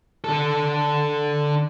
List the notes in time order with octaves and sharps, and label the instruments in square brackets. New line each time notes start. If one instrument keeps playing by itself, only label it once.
[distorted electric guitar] D3 A4